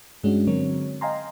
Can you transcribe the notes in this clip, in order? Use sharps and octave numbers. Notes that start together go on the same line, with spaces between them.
G2 G#3 C#4 D4 F#4
D3 F#3 C4 A#4 C#5
D#5 F5 G5 G#5 A#5 C6